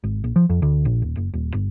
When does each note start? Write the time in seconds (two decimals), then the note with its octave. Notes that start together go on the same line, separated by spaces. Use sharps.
0.04 G#1
0.24 A#1
0.36 F3
0.50 F2
0.62 D2
0.85 A#1
1.02 D#1
1.17 F#1
1.34 D#1
1.54 G1